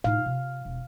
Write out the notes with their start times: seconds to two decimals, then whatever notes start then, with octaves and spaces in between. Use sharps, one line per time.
0.04 A2 D#4 F5
0.26 C3
0.65 E1